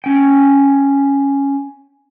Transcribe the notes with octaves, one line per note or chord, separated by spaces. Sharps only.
C#4 G5